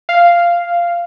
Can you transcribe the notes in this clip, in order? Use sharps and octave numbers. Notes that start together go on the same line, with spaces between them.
F5